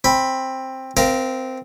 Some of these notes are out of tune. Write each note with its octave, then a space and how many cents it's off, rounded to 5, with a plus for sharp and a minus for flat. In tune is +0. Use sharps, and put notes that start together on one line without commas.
C4 +10 B5 +0
C4 -10 A#4 +20 F5 -25